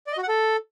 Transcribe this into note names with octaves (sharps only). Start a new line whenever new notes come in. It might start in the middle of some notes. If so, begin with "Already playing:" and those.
D5
D#5
F#4
F#5
A4